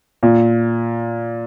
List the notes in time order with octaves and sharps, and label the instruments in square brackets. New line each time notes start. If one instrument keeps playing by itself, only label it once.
[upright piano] A#2